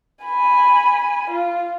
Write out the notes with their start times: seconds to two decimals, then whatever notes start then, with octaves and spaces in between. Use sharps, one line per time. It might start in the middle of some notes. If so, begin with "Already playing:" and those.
0.24 G#5 B5
1.30 F4